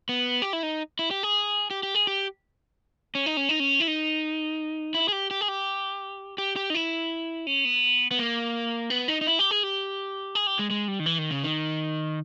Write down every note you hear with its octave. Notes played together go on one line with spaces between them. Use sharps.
B3
G4
E4
D#4
E4
G4
G#4
G4
G4
G#4
G4
C#4
D#4
C#4
D#4
C#4
E4
D#4
E4
G#4
G4
G4
G#4
G4
G4
G4
D#4
E4
C#4
B3
B3
A#3
B3
D#4
D#4
E4
G4
G#4
G4
G#4
G4
G#3
G#3
G3
D#3
E3
D#3
C#3
D#3